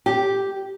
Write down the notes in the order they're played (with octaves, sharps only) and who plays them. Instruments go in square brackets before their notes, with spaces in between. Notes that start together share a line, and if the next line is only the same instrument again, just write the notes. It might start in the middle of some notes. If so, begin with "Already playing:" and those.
[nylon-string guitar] G4